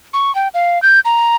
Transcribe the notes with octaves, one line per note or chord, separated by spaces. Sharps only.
C#6
G5
F5
G6
A#5